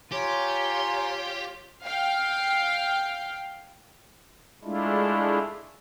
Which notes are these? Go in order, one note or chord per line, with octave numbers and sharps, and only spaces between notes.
F4 G4 C#5 G#5 A#5 C6
F5 G5
G#3 A3 D4 E4 F4